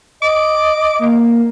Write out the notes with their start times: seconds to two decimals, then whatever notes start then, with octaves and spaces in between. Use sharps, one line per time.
0.22 D#5 D6
0.99 A#3